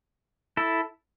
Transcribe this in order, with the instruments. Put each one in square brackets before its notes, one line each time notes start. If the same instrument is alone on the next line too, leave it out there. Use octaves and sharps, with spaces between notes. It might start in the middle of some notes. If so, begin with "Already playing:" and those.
[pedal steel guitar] E4 A4